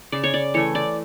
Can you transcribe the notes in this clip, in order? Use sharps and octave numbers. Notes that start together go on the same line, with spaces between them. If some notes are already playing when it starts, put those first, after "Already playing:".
C#3 D5
C#5
D5
E3 A3 C#5
D5